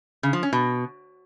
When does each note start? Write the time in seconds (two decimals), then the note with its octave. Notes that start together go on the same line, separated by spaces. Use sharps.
0.23 C#3
0.33 F3
0.43 C#4
0.53 B2